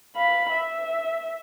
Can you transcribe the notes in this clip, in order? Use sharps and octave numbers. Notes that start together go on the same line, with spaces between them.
F5 B5
E5